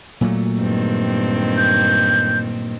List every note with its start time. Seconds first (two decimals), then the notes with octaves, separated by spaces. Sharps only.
0.21 A#2 F#3 A3
0.59 G2 D#3 C4
1.57 G6